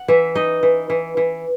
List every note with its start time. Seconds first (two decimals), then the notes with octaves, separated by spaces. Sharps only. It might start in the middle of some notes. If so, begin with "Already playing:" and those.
Already playing: F#5
0.08 E3 E5
0.35 D#4 D#5
0.63 E3
0.90 E3
1.17 E3